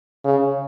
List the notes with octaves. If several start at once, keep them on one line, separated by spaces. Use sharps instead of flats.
C#3